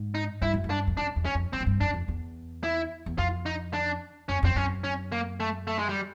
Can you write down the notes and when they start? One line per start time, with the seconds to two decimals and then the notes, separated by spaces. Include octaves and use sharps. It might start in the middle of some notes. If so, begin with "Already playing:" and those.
Already playing: G#2
0.15 D#4
0.42 G2 E4
0.54 F#2
0.64 G2
0.70 D4
0.87 F2
0.97 F#2 D4
1.16 E2
1.25 C#4
1.35 F2
1.53 F#2 C4
1.60 G#2
1.66 G2
1.81 F#2 D4
1.94 F2
2.08 E2
2.64 E4
3.06 E2
3.18 F2 F4
3.46 D#4
3.73 D4
4.29 F#2 C#4
4.43 F2 C4
4.56 F#2 C#4
4.84 C#4
5.12 A#3
5.40 A3
5.67 A3
5.79 G#3
5.89 G3